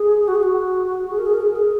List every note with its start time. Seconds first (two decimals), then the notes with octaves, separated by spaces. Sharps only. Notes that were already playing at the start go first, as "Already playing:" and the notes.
Already playing: G#4
0.28 F#4
0.35 G#4
0.43 F#4
1.11 G#4
1.18 A#4
1.26 G#4
1.33 A#4
1.40 G#4
1.49 A#4
1.55 G#4